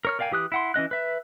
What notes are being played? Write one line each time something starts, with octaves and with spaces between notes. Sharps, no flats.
A#4 C#5 F6
A#4 D5 F5 G5 G#5
E3 G4 D#6 F#6
E4 F#5 C6
E3 C#4 D#5 F#6
B4 E5